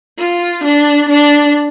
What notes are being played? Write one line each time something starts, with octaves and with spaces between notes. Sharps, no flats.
F4
D4
D4